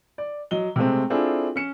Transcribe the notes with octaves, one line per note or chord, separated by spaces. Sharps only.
D5
F#3 D#5 G7
C3 G#3 A3 C4
C4 D4 E4 F4 G#4 A4
C#4 C#7 E7